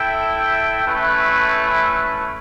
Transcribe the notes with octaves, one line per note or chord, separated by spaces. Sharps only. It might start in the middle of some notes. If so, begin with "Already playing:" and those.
Already playing: E4 A4 E5 G5
A3 C#4 E4 B4